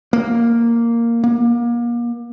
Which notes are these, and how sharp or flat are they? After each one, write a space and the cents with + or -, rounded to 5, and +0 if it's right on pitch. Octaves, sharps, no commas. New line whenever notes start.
A#3 -5
A#3 +35